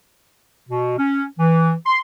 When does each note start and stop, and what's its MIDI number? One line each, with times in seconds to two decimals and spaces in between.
0.68 0.97 47
0.98 1.24 61
1.39 1.72 52
1.86 1.99 84